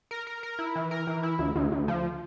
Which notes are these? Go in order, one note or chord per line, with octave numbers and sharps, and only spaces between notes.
A#4
A#4
A#4
E4
E3
A#4
E3
E4
D2
D2
D2
F3